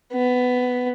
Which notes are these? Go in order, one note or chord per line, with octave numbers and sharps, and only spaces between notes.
B3